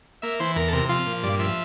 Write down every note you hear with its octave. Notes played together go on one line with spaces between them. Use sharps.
A#3 E5
E3 C5
E2 A#4
A4
C3 A#4
F3 F4
A#2
G2 D5
F3 E5